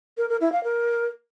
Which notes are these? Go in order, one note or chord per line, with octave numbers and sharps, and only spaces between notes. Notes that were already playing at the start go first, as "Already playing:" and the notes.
A#4
A#4
E4
F5
A#4